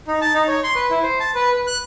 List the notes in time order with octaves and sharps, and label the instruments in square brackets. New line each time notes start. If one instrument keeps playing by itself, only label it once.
[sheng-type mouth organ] D#4
A5
D#4
C#5
C6
B4
E4
C5
A5
B4
B4
F#6